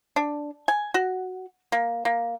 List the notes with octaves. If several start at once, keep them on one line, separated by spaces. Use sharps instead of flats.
D4
G#5
F#4
A#3
A#3